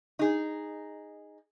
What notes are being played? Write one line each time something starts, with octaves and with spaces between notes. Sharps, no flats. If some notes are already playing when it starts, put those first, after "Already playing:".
D#4 G#4